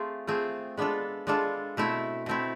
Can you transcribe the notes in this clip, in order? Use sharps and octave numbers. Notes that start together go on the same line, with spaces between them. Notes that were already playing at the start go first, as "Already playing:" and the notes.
Already playing: A3 C4 F4 G#4
A3 C4 F4 G#4
G#3 B3 D4 F4 A4
G#3 B3 D4 F4 A4
B2 A3 C4 E4
B2 A3 C4 E4